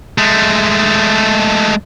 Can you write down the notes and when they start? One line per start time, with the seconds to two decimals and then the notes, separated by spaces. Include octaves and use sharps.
0.18 G#3 A3